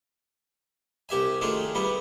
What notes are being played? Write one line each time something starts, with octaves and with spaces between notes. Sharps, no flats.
C2 G4 E5 G#5
D#3 G#3 A3 D4 F4
G3 B3 E4